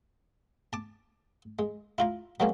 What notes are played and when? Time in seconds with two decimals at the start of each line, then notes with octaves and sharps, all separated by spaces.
0.73 A5 D6
1.59 G#3
1.98 E4 F4 A#5
2.40 F#3 G#3 A#3 C4 C#4